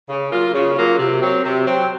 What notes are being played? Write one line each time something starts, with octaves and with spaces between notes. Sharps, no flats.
C#3
F#3 A#3 F4
C#3
F#3 A#3 F4
C3
F#3 C4
C3
F#3 C4